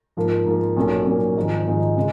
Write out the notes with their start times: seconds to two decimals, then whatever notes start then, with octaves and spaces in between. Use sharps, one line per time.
0.17 G#2 F3 A#3
0.46 G#2 F3 A#3
0.77 B1 A#2 F#3 A#3 C#4
1.07 B1 A#2 F#3 A#3 C#4
1.36 G#1 G#2 F3 G#3 D#4
1.67 G#1 G#2 F3 G#3 D#4
1.97 C#3 G#3 D#4